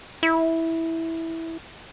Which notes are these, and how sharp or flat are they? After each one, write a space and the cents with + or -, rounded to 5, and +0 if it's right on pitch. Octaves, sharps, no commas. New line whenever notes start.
E4 -10